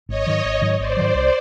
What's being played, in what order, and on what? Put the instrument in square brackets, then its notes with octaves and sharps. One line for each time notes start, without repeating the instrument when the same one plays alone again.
[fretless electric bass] G#1 [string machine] C#5 D#5
[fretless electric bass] G#2 D#3 F#3
G#1
G#2 D#3 F#3
[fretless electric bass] G#1 [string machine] C5 D5
[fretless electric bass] G#2 D#3 F#3
C2